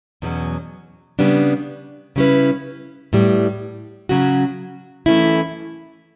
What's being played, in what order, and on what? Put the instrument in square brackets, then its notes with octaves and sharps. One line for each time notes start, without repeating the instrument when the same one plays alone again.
[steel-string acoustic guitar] E2 B2 F#3 C#4
C#3 G3 B3 D4
C#3 G3 C#4 E4 B4
A2 G3 B3
C#3 F#3 C#4 F#4
F#2 E3 A3 C#4 E4